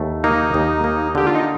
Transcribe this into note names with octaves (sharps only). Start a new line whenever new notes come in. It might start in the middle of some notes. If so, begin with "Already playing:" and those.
Already playing: D#2 A3
A#3 D#4
D#2
A#3
D3 G4
F4
D#4